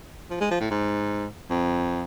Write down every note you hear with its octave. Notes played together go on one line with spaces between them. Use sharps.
F3
G#3
F3
A2
G#2
F2